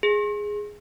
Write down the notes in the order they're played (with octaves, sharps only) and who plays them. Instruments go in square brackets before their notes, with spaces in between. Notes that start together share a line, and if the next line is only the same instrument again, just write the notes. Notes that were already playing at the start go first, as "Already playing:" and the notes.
[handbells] G#4